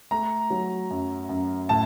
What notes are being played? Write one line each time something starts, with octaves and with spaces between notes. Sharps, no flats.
A3 A#5
F#3
F#2
F#2
A2 A5